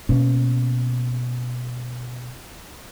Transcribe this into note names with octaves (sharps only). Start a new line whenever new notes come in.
B2 A#3 C#4